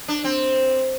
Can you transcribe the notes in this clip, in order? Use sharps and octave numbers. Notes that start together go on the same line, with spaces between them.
D4
C4